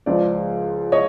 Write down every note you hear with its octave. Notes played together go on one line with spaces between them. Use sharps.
C#2 C#3 F3 D5
C#5 D#5